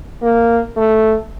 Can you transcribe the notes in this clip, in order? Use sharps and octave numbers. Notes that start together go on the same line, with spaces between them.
A#3
A3